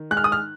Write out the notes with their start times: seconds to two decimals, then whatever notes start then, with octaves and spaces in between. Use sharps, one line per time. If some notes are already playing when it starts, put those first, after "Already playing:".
Already playing: D#3
0.11 G#3 F#6
0.17 F6
0.24 D#6
0.32 F6